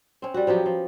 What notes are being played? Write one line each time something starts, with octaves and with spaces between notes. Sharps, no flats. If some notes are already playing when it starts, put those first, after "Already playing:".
C4 C#4
G3 F#4
F3 F#3 B3 G4
F3